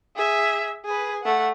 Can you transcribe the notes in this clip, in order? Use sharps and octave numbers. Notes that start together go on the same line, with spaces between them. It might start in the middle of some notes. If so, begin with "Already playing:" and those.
G#4 E5
G#4 B4
A3 F#5